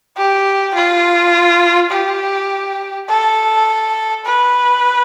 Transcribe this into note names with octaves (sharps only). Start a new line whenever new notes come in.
G4
F4
G4
A4
B4